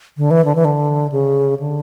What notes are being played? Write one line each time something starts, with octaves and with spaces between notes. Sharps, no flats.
D3
E3
D3
E3
D3
C#3
D3